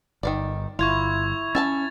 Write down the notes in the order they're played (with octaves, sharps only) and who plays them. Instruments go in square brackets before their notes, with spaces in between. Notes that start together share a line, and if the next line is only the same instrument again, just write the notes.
[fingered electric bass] G1 [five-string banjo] D#3 A#3 D5
[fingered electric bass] G1 [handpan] E4 [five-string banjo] F4 [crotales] C#6 G#6 F7
[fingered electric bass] C#4 [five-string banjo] E5 G#5 A5 [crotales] A6